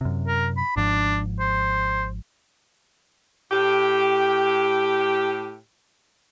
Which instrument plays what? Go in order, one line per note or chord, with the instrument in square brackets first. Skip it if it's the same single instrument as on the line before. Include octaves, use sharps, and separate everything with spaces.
[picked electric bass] F#2 C3
[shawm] A#4
B5
[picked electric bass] G#1 G#2 F3 [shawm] D4
[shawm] C5
[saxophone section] A2 G4